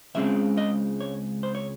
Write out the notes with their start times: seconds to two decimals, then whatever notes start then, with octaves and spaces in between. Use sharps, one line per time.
0.15 C#2 C#3 G#3 C4 E5
0.57 D#5
1.01 C#5
1.43 C5
1.55 C#5